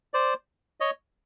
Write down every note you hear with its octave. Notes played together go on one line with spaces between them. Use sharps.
C5 D5
C#5 D#5